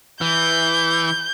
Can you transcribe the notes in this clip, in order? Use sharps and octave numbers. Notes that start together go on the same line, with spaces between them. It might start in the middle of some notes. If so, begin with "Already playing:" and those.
E3 G6